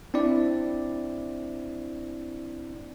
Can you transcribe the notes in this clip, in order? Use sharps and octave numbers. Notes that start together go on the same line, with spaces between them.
C4 D4 E4 D5